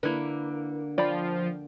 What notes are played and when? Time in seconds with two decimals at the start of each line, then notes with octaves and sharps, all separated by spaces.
0.03 D3 A#3 E4 B4
0.98 F3 D5 G5 B5